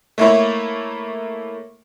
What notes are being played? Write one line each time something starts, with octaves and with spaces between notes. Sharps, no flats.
A3 A#3 E4 C#5